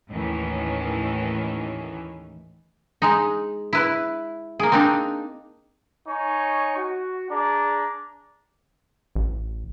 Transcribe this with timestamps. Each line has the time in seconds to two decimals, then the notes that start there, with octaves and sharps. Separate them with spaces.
0.10 D#2 A2 D#3 E3 C#4
3.02 G#3 D#4
3.73 E4 B4
4.60 A#3 G#4
4.72 C4 D4 D#4
6.08 D#4 C#5 G#5 C#6
6.77 F#4
7.30 D4 G#4 D5 A#5
9.16 A1